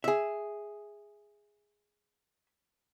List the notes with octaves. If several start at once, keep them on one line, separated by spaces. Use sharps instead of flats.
G#4 E5